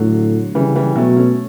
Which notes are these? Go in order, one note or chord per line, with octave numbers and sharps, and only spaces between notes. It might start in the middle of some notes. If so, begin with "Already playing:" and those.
Already playing: A2 D3 F#3
C#3 E3 G3
E3 G3
B2 F#3 A3
A3 C#4